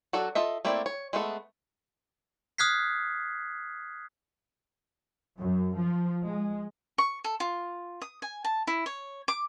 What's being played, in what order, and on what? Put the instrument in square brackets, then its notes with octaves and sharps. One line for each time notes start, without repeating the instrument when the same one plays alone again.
[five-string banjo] F#3 D4 F#4 A4
F4 A4 D#5 E5
A3 A#3 C4 E4 D5
C#5
G#3 A3 B3 F4 A4
[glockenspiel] D#6 F6 F#6 G#6 B6 C7
[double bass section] F#2
F3
G#3
[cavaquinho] C#6
A4
F4
D#6
G#5
A5
E4
C#5
D6